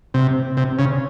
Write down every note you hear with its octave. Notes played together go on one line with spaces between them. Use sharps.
C3
C3
C#3